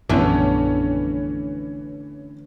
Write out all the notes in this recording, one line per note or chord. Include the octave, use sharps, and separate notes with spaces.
A#1 F#2 D3 E3 A3 B3 C#4